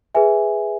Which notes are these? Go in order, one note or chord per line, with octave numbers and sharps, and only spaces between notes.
G#4 B4 E5 G#5